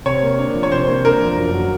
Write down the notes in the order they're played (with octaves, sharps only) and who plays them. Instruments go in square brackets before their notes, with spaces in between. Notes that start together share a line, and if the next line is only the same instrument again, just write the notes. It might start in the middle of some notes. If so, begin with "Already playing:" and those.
[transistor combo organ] C3 [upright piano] C#5
[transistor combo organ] A#3
D4
F3
[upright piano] C#5
[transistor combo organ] C3 [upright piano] C5
[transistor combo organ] A#3
[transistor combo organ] D4 [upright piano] A#4
[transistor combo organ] F3
F#2
F#3